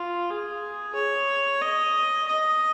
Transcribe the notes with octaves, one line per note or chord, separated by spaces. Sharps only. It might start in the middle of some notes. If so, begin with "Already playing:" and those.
Already playing: F4
G#4
C#5
D#5
D#5